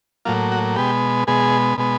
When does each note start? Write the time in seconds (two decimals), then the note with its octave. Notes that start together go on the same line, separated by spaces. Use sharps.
0.25 A2 F#3 A#3 F4
0.52 F#4
0.76 B2 G#3 B3 G4
1.27 B2 G#3 B3 G#4
1.78 B2 G#3 B3